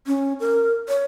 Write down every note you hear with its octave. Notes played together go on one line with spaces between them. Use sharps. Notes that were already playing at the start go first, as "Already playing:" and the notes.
C#4
A#4
C#5